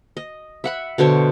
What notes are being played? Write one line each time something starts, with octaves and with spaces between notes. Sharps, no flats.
D#5
E5 F#5 B5
B2 D3 C5 C#5